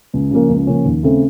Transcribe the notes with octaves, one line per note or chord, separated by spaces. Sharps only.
C#2
C#3 F3 A#3 C#4
C#2
C#3 F3 A#3 C#4
D#2
C#3 A3 C4